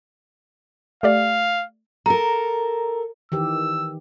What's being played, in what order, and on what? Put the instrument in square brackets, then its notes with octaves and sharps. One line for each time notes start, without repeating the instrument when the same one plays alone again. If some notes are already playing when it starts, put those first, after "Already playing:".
[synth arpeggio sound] A3 G4 D5 [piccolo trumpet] F5
[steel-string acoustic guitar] A4 A#4 [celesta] A#5
[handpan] D#3 E3 G4 [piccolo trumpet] E6